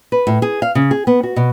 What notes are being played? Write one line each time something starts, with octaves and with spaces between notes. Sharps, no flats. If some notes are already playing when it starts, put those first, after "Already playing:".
B4
A2
G#4
F5
C#3
G#4
B3
F#4
B2